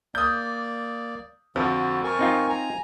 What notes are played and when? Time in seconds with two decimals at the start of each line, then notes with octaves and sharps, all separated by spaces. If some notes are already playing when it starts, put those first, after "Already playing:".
0.15 A#3 D5 D#6 G6
1.56 F2 D3 F3 F#4
2.04 A#4 G#5 C#6
2.19 C4 D#4 F4
2.49 G#5 A#5